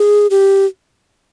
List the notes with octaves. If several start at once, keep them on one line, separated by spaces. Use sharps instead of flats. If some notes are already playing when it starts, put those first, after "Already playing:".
Already playing: G#4
G4